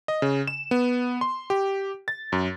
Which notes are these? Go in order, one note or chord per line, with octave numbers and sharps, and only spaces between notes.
D#5
C#3
E7
B3
C6
G4
A6
F#2